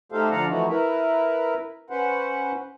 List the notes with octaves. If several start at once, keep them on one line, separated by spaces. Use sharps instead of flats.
A3 D#4 G4 A4 C5 F5
D3 F3 D5 F5 F#5 A#5
E3 F3 A3 D#4 E4 F#4
E4 A#4 B4 E5
C#4 B4 C5 F#5